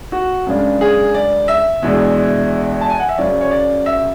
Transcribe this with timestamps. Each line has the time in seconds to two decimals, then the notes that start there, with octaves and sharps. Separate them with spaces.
0.12 F#4
0.47 F#2 C#3 G#3 D4
0.81 G#4
1.14 D5
1.48 E5
1.82 E2 B2 G#3 D4
2.81 A5
2.90 G#5
3.00 F#5
3.09 E5
3.18 F#2 C#3 F#3 C#4 D5
3.41 C#5
3.51 D5
3.86 E5